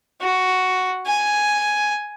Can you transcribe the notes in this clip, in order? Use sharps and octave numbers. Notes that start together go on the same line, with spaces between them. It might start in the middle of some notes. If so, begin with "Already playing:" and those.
F#4
G#5